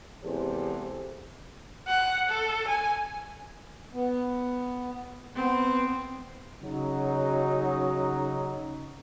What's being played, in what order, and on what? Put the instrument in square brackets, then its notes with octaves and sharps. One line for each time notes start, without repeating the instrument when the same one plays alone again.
[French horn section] E2 C3 G#3 G4 A4 C5
[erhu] F#5
A4
G#5
[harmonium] B3
[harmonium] B3 [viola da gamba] C4
[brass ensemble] C#3 F#3 D#4